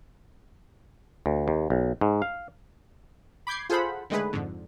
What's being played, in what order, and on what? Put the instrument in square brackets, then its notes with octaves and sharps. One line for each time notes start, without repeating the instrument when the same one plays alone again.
[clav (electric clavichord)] D2
D#2
B1
G#2
F5
[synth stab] B5 D6 G6 G#6 C7
F4 G#4 A4 C5 F#5 B5
D3 D#3 G#3 A3 G#4 B4
F2 G#2 D3